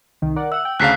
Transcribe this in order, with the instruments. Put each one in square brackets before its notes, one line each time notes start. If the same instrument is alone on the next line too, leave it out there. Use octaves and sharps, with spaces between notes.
[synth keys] C2 D#3
A#4 D5 F#5
[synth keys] E5 F#5 [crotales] E6
[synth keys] G5
[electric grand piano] D2 C#3 F5 [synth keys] A5 A#5 [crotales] F#6 B6 C7